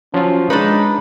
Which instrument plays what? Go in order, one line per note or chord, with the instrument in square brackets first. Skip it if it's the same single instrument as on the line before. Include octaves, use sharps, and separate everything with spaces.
[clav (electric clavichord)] F3 F#3 F4 [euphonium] C#4
[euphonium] G#3 [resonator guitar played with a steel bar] D4 B4 [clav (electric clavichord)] D#4